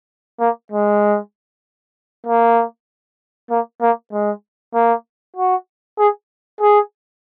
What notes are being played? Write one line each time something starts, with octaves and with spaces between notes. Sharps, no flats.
A#3
G#3
A#3
A#3
A#3
G#3
A#3
F#4
G#4
G#4